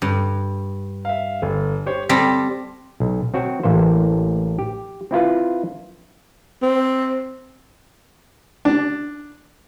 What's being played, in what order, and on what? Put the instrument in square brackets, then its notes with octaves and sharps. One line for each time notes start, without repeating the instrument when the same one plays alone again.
[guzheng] G2
[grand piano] E5 F5
G1
G4 C5 C#5
[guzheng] G3 C4 [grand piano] A5 A#6 B6
[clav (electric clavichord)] B1
C4 F#4 C#5 G5
A1 E3 A#3 C5
G4
C4 E4 F4 B4
[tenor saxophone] C4
[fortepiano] D4